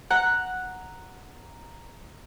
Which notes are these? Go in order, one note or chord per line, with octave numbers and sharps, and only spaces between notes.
F#5 A#5